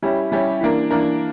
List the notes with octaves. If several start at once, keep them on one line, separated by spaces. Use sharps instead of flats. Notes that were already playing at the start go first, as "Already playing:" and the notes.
G3 C#4 E4 G4
G3 C#4 E4 G4
E3 A#3 D4 A#4
E3 A#3 D4 A#4